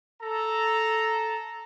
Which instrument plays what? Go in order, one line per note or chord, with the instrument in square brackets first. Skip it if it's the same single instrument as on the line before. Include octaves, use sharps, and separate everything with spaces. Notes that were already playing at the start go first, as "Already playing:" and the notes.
[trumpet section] A4 A#5